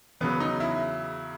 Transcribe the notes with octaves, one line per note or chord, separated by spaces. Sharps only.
E2 C#3 F#3 B3
D#4
E4